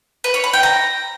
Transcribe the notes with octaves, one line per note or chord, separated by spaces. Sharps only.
B4
C#5
B5
G5
A#5